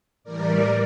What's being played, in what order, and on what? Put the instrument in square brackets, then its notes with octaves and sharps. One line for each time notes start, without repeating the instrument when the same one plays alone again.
[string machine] A2 E3 G3 A#4 D5